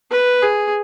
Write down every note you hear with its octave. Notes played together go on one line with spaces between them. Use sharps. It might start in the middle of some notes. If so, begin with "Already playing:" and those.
B4
G#4